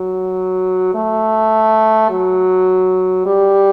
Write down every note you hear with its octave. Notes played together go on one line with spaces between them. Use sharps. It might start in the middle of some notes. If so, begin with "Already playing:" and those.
Already playing: F#3
A3
F#3
G3